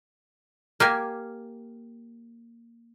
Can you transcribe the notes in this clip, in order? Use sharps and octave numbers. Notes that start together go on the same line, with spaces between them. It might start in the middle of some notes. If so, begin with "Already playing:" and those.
A#3 G4 G#5